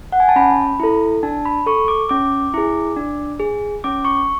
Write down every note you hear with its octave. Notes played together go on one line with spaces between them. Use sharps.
F#5
G#5
A5
C#4 B5
E4 A4
D4 A5
B5
A4 C#6
D6
C#4 D6
E4 G#4
D4
G#4
C#4 D6
C#6